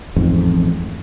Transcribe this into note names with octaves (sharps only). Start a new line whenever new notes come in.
A1 F2 G#2